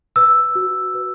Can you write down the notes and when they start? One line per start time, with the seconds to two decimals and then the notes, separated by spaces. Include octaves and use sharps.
0.16 B4 E6
0.55 F#4
0.94 B4